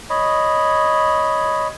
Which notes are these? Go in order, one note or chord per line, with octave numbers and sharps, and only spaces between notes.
C#5 D#5 B5